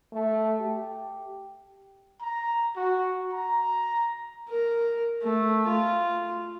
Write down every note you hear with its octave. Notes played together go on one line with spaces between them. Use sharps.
A3
G4
A#5
F#4
A#5
A#4
A3
F4